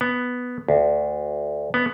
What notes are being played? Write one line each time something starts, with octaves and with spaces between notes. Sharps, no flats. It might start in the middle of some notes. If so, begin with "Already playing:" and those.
B3
D2
B3